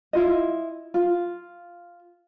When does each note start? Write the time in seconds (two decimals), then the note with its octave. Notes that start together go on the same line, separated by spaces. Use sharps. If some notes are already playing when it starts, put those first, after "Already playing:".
0.13 E4 F4 D#5
0.94 F4